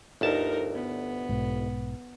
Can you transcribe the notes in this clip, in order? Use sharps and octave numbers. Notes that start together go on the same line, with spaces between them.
G1 D2 D#4 A#4 A5
B3
B1 G#2